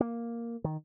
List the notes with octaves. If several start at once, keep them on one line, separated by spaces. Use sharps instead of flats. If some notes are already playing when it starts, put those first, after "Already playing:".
A#3
D#3